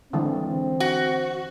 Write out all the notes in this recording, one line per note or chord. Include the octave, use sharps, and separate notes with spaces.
D3 E3 G#3 C4
F#4